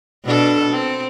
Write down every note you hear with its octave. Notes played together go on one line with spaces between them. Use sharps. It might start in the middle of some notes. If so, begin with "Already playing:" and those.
B2 D4 A4
C4